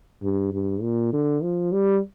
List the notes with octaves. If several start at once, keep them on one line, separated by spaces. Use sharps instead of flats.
G2
G2
A#2
D3
F3
G3